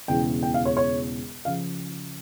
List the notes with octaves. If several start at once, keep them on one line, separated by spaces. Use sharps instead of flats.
E1 E2 C#3 E3 G5
G5
F5
C#5
C#5
C#3 F3 F5